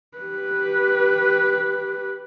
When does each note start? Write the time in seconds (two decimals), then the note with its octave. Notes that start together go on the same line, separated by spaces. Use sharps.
0.18 G4 B4